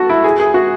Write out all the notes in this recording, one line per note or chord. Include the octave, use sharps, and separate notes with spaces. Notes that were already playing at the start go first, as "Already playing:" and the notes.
Already playing: F#4 A4
E4
G#4
G#4
F#4